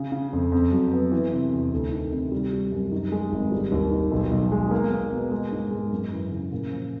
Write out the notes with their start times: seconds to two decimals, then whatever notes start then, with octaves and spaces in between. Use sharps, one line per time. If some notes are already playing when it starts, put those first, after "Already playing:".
Already playing: C#3
0.12 C#3
0.33 F2
0.52 F2
0.72 F#3
0.92 B3
1.12 E3
1.33 C3
1.52 E2
1.72 D2
1.92 D#3
2.12 C3
2.32 G3
2.53 G3
2.72 F#2
2.91 D#3
3.12 G#3
3.32 G#1
3.52 G3
3.72 D#2
3.91 D#3
4.11 B1
4.31 B1
4.52 G#3
4.71 A#3
4.92 A#3
5.12 B2
5.31 G#3
5.52 G#2
5.71 G#3
5.92 F#2
6.12 E3
6.31 C#3
6.52 A#2
6.71 F3